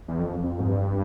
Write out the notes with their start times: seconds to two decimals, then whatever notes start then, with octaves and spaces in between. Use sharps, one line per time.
0.08 E2
0.19 F2
0.44 F2
0.59 G#2
0.67 G2